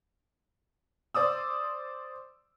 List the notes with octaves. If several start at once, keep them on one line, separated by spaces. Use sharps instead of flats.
C5 D5 D#6 E6